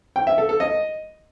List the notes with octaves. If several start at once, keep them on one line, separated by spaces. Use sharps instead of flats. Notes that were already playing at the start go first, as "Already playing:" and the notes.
G5
E5
A4
A4
D#5